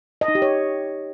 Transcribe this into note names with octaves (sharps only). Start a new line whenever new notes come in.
D#5
D#4
G4
C#5